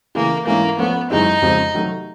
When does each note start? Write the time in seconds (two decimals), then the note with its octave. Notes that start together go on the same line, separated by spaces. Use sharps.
0.15 C#3 E3 A3 A#3
0.46 G#2 E3 A3 A#3 C#4 E4
0.79 F3 A3 B3 C#4
1.10 F#2 D#3 G#3 C4 D#4 E4
1.42 F2 C#3 F3 G#3 C4
1.74 C3 D#3 F#3 A3